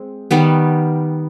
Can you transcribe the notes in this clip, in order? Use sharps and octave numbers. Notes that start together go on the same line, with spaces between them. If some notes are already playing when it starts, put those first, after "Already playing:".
Already playing: G#3 C4
D#3 G3 B3